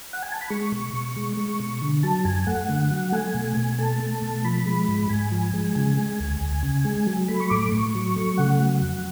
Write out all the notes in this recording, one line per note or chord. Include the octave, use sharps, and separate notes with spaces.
F#5
G#5
A5
B5
G#3 C#6
B2
B2
G#3
G#3
B2
D3
F#3 A5
F#2 G#5
A3 F#5
D3
F#3
A3 G#5
B2
B2
A3 A5
A3
B2
F3 B5
G#3
G#2
G#2 G#5
F3
G#3
C#3 G#5
G#3
D2
D2
C#3
G#3
F#3
A3 B5
C#6
A2 D6
A2 C#6
F#3
A3
C#3 F#5
F#3
F2